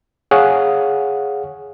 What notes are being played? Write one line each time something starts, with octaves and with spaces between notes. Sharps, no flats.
G#4 C#5 F5 F#5 D#6